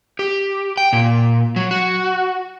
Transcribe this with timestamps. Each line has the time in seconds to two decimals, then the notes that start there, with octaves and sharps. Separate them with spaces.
0.19 G4
0.77 G5
0.93 A#2
1.56 F#3
1.71 F#4